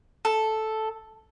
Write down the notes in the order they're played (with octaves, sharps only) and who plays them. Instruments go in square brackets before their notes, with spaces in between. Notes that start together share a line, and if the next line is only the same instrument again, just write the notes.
[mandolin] A4